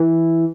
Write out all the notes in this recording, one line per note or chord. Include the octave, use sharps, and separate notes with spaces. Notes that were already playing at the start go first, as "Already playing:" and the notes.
Already playing: E3